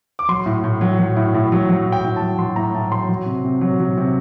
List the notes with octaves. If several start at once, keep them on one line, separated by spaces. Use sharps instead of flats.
D6
F#3 C6
A2
A2
F#3
F#3
A2
A2
F#3
F#3
A2
G5
A2
F#3 A5
F#3 C6
A2 A#5
A2 A5
F#3 C6
F#3
C3
C3
F#3
F#3
C3